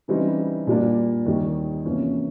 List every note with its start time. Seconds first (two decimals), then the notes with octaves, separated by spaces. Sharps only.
0.08 C#3 E3 G3 C4 D#4
0.67 A#2 G3 A#3 D4
1.26 D#2 D#3 G3
1.85 E2 C3 F3 A#3 C#4